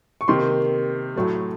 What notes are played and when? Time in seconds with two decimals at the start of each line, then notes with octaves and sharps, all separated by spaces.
0.21 C#6
0.28 C3 D#3 A#3 C6
1.16 A2 F#3 A3